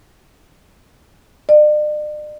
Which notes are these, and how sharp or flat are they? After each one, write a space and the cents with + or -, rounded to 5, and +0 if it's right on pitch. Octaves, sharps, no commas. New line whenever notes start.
D5 +40